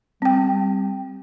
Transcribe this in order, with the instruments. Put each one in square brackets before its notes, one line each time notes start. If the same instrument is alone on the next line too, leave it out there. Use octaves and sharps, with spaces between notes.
[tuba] G3 [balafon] C4 G5